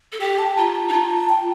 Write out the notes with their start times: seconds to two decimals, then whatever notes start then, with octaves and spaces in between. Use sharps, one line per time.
0.12 A4
0.20 G4 G5
0.39 A5
0.57 F4 A#5
0.76 A5
0.89 D#4
0.93 F4 A#5
1.11 A5
1.29 G5